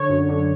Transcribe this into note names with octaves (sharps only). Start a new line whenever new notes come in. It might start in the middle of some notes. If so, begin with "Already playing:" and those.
Already playing: D3 C#5
F#2
D3